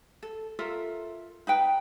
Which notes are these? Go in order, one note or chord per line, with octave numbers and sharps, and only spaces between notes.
A4
F4 A4 A#4 E5
D#4 B4 G5